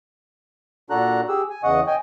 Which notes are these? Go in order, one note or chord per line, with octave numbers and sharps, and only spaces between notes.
A#2 D4 F#4 A4 A#5 F#6
G4 G#4 E6
G#5
E2 C#3 D#5 F#5 C#6 D#6
D#5 G5 G#5